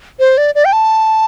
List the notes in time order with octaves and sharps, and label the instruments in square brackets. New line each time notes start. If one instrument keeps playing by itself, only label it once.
[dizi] C5
D5
D5
G5
A5